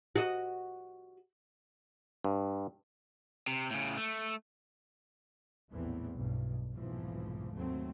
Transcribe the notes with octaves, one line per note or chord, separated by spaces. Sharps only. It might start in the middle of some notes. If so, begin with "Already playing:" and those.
F#4 D#5
G2
C3
A2 C#3
A3
A#1 E2 A2 E3 A3 C4
B1 G2
F1 B1 G#2 E3 F3
D#2 F#3 A3 C4